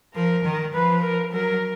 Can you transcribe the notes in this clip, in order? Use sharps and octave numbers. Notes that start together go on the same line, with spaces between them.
F3 A#4
D#3
F3 B4
A#4
F#3 A#4